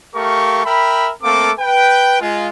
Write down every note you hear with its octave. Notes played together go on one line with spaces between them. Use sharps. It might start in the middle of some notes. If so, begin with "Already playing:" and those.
A3 G4 A#4 F5 C#6
A#4 E5 G5 B5
A3 A#3 C4 A4 F5 D6
B4 G5
G#3 F4